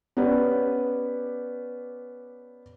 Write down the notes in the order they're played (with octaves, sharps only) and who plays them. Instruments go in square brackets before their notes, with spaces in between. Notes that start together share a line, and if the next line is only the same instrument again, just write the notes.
[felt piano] B3 C#4 G4 B4 D5